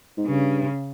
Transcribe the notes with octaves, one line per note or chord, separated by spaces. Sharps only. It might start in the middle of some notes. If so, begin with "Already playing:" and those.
G#2
G2 C#3